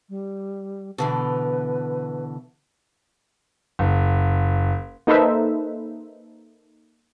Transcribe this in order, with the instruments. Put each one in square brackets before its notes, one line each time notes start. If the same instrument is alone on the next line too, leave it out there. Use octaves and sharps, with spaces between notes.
[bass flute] G3
[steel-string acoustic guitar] B2 D3 E3 [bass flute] B4
[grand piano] F#1
[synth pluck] A#3 D#4 A4 B4 C5 E5